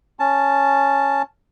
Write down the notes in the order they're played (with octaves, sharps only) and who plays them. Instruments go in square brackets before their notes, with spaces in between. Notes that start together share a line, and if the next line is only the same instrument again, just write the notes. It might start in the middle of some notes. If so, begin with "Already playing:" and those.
[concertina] C#4 A5